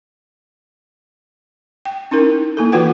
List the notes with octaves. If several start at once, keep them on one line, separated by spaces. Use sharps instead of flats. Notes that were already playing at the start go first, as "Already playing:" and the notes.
G5
C#4 D#4 E4 A#4
A#3 E4 A4
E3 F4 F#4 B4 F#5 G5